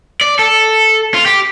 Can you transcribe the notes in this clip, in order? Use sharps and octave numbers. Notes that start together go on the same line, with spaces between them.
D5
A4
F4
G4